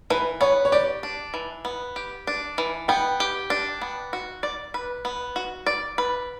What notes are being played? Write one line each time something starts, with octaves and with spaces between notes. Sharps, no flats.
E3 B4
B3 C#5
C#5
G4 D5
D4
E3
B3
G4
D4
E3
B3 G5
G4
D4
B3
F#4
D5
B4
B3
F#4
D5
B4